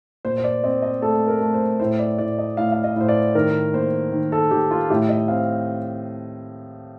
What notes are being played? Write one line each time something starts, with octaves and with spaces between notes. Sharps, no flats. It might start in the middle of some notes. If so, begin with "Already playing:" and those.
A#2 C5
C5
D5
C4 D#5
D#5
A3 A4
A#4
A3
C5
A2 C5
D5
A2 D5
D#5
A2 F5
F5
D#5
A2 C5
D5
D#3 A#4
A#3 C5
D#3
A4
D#3 G4
F4
A2 G4
D#5
C4 F5